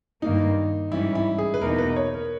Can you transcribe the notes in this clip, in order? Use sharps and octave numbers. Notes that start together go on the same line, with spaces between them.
G2 D#3 A#3 D#4
G#2 E3 G3 C#4 E4
E4
G#4
B4
E2 B2 A#3 D#4 A#4
B4
C#5
A#4